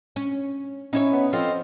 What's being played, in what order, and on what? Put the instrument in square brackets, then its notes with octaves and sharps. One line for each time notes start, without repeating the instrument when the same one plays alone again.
[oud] C#4
[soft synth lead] C#4 [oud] D#4 E4 C#5
[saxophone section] B3
[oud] F3 [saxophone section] C4 F4 A4 [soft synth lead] D#5